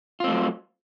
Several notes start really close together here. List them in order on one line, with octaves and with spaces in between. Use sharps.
F4 C4 A3 F#3